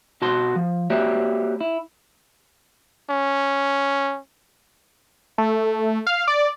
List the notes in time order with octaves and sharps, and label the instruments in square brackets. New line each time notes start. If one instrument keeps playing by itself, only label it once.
[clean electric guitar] B2 F#4 A5 C6
F3
A#3 F#4 G4 C#5 D5 E5
E4
[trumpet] C#4
[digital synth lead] A3
F5
D5